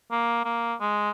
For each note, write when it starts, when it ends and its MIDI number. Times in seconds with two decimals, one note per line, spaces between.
0.11 0.41 58
0.45 0.74 58
0.81 1.11 56